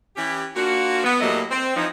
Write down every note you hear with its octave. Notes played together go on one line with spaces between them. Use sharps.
E3 C#4 E4 G4
A#3 D4 F4 F#4
B3
A2 F#3 G3 A3 A#3 D#5
C4
E3 F3 D#4